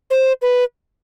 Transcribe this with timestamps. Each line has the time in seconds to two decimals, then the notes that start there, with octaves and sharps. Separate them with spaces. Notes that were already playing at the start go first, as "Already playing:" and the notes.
0.10 C5
0.42 B4